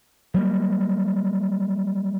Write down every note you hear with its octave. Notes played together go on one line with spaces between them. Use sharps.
F#3 G3 A#3